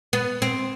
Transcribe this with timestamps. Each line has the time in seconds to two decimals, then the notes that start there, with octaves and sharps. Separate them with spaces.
0.13 B3
0.42 C4